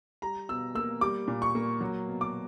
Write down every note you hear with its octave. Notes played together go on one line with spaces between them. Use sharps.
G3 A#5
B2 E6
A#3 E6
G3 D6
A#2
C#6
A#3
F#3
B2
D6